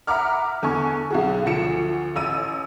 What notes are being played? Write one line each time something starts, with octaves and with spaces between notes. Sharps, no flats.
E5 F#5 A#5 B5 D6 F6
E2 D3 A4 G#5 C#6
B1 F#4 G#4
D2 F3 C#7 E7
A1 E6 D#7